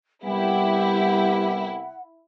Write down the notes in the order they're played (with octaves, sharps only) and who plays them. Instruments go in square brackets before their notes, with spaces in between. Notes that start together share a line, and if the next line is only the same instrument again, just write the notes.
[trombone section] C2 B3 G4 [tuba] G3 [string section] E4 [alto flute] F#5